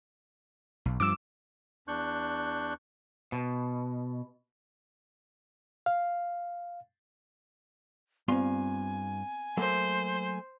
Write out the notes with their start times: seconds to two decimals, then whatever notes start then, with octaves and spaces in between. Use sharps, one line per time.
0.85 B1
1.00 G2 F3 D6 E6
1.88 E2 D4 C#6 F#6 G6
3.32 B2
5.86 F5
8.28 G2 B3 C4 F4 G#5 C6
9.57 F#3 A3 A#3 C5